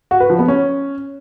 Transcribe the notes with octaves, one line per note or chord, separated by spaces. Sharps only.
F#4
B4
F3
B3
C#4